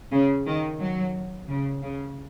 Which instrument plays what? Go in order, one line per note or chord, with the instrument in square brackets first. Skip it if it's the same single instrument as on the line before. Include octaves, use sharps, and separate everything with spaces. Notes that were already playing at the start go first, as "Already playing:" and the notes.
[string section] C#3
D#3
F#3
C#3
C#3